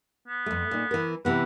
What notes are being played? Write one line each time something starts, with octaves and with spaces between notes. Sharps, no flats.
B3
F2 A3
A#2 D#4
E3 A#4
C3 E3 B3 B4